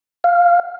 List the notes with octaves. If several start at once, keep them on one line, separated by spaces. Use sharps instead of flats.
F5